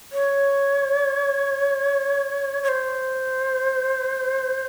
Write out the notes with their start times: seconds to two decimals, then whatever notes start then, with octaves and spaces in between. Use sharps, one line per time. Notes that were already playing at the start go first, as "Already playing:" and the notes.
0.13 C#5
2.63 C#5
2.69 C5